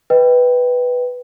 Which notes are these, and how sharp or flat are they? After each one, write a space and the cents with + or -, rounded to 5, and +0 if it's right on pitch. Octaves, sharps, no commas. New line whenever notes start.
B4 +0 D#5 +5 G5 +0